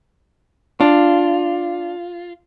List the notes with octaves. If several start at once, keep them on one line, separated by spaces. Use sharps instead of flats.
D4 F4